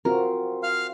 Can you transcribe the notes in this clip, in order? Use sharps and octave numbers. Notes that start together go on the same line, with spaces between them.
C4 F4 F#4 A#4
F5 F6